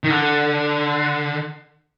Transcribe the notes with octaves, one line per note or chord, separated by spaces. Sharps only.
D#3
D3